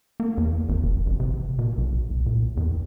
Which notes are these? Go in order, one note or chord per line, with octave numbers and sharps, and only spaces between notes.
A#3
E2
G#1
F1
A1
C3
B2
B1
C2
A#2
E2